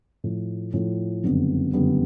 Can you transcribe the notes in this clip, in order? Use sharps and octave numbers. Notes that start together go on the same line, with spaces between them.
A2 F3 A3
A2 F3 A3
F#1 F2 D3 G3 B3
F#1 F2 D3 G3 B3